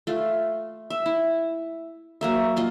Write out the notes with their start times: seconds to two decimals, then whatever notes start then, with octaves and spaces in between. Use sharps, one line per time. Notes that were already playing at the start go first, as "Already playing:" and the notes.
0.07 A3 F4
0.90 E5
1.06 E4
2.21 F#3 A#3 E5
2.56 A#3 F4 D#5